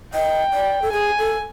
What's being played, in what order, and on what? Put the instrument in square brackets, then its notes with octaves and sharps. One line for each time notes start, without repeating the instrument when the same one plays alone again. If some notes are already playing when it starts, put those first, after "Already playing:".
[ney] D#5 [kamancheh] G5
[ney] D5
A4
[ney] G#4 [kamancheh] G#5
[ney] A4